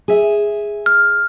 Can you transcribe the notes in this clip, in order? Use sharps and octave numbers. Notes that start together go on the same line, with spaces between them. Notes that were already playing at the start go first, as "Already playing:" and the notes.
G#4 E5
F6